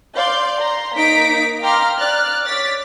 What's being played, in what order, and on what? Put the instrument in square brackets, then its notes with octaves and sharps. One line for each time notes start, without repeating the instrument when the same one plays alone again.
[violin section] D5 F5 C6 G6
A#5 C6
A#3 D#4 A#6 B6 D7
F5 G5 A#5 C6 D6 F6
D5 F6 F#6 A6
C#5 D6 A6 B6